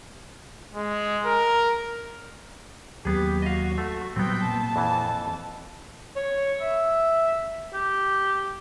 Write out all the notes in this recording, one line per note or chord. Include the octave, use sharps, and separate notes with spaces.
G#3
A#4
D#2 F#3 A#3 B3 G4 G#4
F#4 D#5 F5
A3
A#2 F#3 G3 B3 C4 G5
A#2 A#3 A5
F2 E3
C#5
E5
G4